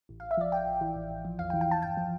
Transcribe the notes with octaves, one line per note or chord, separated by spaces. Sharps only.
A1
A1 F5
E5
F3 D5
A1 G5
A1
E3
A1
A1
F3
E2 F5
G5
E3
G5
E2 A5
G1 G5
F3